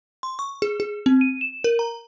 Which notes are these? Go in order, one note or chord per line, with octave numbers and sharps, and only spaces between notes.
C6
C#6
G#4
G#4
C4
D#7
E7
A#4
A#5